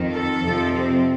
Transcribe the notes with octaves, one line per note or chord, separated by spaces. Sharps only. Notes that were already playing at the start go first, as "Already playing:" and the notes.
Already playing: F2 D#3
A4
F2 C3 F3
C4